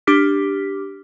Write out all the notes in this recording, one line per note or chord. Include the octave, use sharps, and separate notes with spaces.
D4 G4 D6 F6 B6